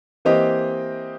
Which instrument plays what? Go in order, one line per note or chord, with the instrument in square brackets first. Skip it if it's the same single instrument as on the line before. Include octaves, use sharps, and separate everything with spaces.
[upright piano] E3 A#3 C4 G4 D#5